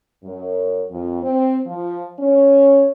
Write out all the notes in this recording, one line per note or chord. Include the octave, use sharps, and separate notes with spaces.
F#2
F2
C4
F3
C#4